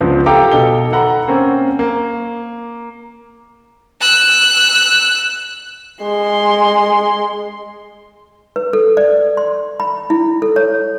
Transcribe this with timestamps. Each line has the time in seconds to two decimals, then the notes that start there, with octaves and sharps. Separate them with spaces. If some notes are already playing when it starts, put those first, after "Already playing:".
0.01 C#2 F3 B3 D4
0.26 G4 A4 F5 G5 A#5 D6
0.51 B2 D#4 A4 G7
0.92 A4 F#5 A#5 B5
1.28 A#3 C4 C#4
1.79 A#3
4.01 E6 F#6
6.03 G#3 C6
8.56 B4
8.73 A4
8.97 D5
9.37 C6
9.80 B5
10.10 E4
10.42 A4
10.56 C#5